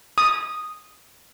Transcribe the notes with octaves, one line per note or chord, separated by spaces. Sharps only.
D#6